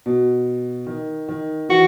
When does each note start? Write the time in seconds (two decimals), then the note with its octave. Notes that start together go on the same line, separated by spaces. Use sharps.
0.06 B2
0.87 D#3
1.28 D#3
1.69 E3 F#4